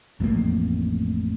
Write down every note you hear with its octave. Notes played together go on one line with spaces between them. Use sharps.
A1 F2 A2 A#3